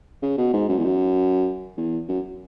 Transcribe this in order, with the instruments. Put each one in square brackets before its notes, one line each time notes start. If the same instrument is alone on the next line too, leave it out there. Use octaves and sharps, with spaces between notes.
[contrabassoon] C#3
B2
G#2
F#2
E2
F#2
E2
F#2